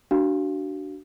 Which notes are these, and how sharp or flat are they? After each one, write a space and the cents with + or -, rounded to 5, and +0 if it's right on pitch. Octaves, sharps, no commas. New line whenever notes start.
D4 +0 F#4 +25 F5 +0